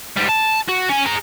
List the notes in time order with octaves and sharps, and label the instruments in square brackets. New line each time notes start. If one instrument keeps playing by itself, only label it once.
[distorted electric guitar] G#2 G3
A5
F#4
C#4 G#5
G#4 A#5